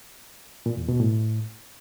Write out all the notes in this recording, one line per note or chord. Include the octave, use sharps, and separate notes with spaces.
A#2
E2
B2
A2